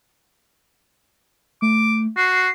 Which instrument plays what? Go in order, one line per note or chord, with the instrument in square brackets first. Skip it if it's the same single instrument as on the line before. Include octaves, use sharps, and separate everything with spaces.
[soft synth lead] A3 [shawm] D6
[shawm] F#4 [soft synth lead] C7